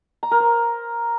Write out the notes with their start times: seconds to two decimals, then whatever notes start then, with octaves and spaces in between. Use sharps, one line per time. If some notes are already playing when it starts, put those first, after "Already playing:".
0.23 A#5
0.31 A#4
0.40 C5